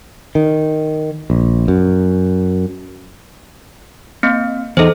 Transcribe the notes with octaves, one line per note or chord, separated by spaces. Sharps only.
D#3
A#1
F#2
A#3 C4
E2 D#4 A4 C5